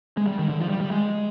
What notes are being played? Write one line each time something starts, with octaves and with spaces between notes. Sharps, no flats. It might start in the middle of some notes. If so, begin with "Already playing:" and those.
G#3
G3
D#3
D3
F3
G3
G3
G#3